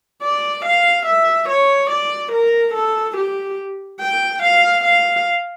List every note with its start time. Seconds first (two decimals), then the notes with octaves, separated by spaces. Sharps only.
0.22 D5
0.65 F5
1.06 E5
1.49 C#5
1.90 D5
2.32 A#4
2.74 A4
3.17 G4
4.00 G5
4.43 F5
4.84 F5